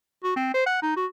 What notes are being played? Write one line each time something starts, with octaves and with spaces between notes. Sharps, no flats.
F#4
C4
C5
F#5
D#4
F#4